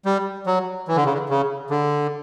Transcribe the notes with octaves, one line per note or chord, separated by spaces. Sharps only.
G3
F#3
E3
D3
C#3
D3
C#3
D3